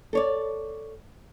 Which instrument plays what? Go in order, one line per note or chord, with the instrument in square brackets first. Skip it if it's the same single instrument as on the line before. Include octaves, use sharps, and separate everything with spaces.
[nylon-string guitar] A4 C#5 D5